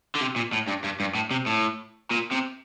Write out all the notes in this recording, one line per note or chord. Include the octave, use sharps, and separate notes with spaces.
D3
C3
A#2
A2
G2
G2
G2
A2
C3
A2
A#2
C3